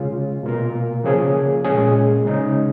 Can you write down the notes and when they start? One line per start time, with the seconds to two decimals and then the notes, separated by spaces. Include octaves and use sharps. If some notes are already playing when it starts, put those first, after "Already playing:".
Already playing: C#3 G#3 C#4 F4
0.43 B2 A#3 F4 A#4
1.04 C#3 F3 A#3 C#4 G#4
1.65 A#2 G#3 C#4 G#4
2.25 C#3 G#3 D#4